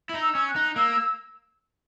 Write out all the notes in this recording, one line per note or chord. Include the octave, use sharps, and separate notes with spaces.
E4
D#4
E6
C#4
F#6
D#4
A#3 E6